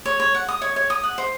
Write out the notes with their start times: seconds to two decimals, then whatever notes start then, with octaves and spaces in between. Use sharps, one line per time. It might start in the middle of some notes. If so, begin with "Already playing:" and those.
0.05 C#5
0.20 C#5
0.35 F#5
0.48 D#6
0.62 C#5
0.76 C#5
0.90 D#6
1.03 F#5
1.18 C5